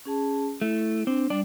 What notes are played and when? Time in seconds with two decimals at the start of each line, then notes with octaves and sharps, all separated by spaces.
0.05 C#4 G#4 A5
0.62 A3 E4
1.07 C4 D4
1.30 G3 D4 D5